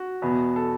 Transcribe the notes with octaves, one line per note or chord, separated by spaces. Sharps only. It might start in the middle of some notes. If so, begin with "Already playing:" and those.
Already playing: F#4
E2 B2 B3
A4